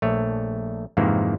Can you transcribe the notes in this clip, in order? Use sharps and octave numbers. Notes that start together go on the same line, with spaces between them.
A#1 A3 C#5
F2 G#2 C3 D#3 E3 A#3